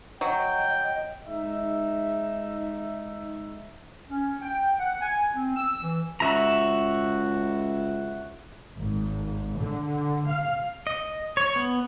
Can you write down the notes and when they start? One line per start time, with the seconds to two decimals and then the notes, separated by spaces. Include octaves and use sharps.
0.21 F#3 D#5 G5
1.25 G#3 D#4 E5
4.09 C#4
4.41 G5
4.79 F#5
5.01 G#5
5.35 C4
5.56 E6
5.81 E3
6.20 C#2 F#4 E5 A#5
8.76 G#1
9.59 D3
10.28 F5
10.87 D#5
11.37 C#5
11.56 B3